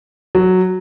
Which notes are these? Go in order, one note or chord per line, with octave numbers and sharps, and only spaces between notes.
F#3